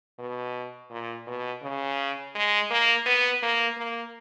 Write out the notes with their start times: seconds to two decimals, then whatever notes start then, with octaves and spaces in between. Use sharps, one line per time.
0.19 B2
0.91 A#2
1.27 B2
1.62 C#3
2.35 G#3
2.71 A#3
3.06 B3
3.43 A#3
3.78 A#3